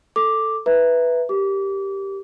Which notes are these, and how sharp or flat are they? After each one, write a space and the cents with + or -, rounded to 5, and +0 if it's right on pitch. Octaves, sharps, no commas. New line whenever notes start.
A4 +5 D6 +0
B4 +0 E5 +0 A#5 +0
G4 +0 A#4 +0 D6 -30